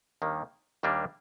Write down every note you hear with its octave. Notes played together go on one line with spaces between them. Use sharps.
D#2 D#3 G3 A#3 D4
D#2 D#3 G3 A#3 D4